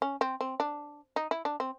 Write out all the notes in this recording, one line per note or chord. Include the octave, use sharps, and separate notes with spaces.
C#4
C4
C4
D4
D#4
E4
D4
C4